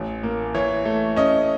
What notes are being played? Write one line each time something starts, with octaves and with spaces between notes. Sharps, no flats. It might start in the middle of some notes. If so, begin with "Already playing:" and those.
Already playing: A1
A#3
E3 C#5
A3
C#4 D#5